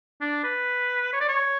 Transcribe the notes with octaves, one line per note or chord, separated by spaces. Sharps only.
D4
B4
C#5
D5
C#5